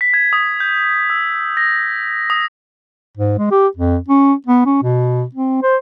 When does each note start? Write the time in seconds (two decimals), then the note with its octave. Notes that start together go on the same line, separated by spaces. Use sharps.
0.01 B6
0.14 G#6
0.33 D#6
0.60 G6
1.10 E6
1.57 A#6
2.30 D#6
3.17 G#2
3.38 G#3
3.51 G4
3.77 F2
4.08 C#4
4.47 B3
4.65 C#4
4.83 B2
5.35 C4
5.63 C5